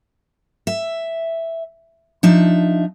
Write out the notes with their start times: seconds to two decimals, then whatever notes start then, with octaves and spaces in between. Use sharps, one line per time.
0.67 E5
2.23 F3 D4 D#4 E5